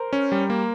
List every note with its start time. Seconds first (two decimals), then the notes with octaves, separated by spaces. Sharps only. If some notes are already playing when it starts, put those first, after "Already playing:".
Already playing: A#4 C5
0.13 C#4
0.32 G3
0.50 A#3